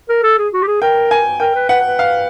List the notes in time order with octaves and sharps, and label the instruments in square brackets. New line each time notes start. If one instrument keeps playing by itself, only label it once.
[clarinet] A#4
A4
G#4
F#4
G4
G#4
[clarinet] A#4 [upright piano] G5
[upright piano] G#5
[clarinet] A#4 [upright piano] G5
[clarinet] B4
[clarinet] B4 [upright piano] F#5
[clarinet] B4
[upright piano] F5